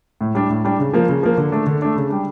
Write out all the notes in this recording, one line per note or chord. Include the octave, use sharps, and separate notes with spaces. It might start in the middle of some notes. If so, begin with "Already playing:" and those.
A2
G3 D4
A2
G3 D4
C#3
F3 A#3
C#3
F3 A#3
D3
A3 D4
D3
A3 D4
C#3
G3 D4